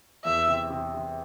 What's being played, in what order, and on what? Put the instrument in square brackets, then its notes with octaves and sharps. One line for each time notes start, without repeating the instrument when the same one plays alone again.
[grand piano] E2 [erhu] E5
[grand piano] C3
C3
C3